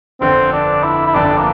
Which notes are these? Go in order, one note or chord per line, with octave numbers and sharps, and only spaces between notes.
G1 F2 D3 C4
D4
E4
E4
G1 F2 D3 D4
A#3